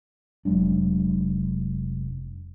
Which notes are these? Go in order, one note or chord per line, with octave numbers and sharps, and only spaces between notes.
F1 F#3 G#3 D4